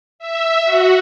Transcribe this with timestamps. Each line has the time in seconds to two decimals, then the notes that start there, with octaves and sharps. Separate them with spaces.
0.19 E5
0.65 F#4